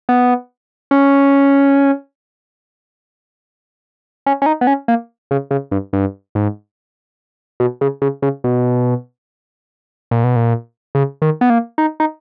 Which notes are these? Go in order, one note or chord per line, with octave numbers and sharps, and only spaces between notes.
B3
C#4
C#4
C#4
D#4
B3
C#4
A#3
C#3
C#3
G2
G2
G#2
B2
C#3
C#3
C#3
B2
A#2
B2
A#2
C#3
D#3
B3
A#3
D#4
D#4